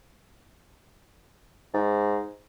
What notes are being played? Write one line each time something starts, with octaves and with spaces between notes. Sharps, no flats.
G#2